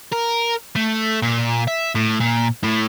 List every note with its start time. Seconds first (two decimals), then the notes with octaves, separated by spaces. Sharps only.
0.12 A#4
0.76 A3
1.22 A#2
1.68 E5
1.95 A2
2.20 A#2
2.63 A2